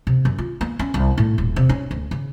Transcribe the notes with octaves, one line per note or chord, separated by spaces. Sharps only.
C3
F#2
F4
A#3
C#4
C2
A2
D#1
C3
C#4
D2
C#3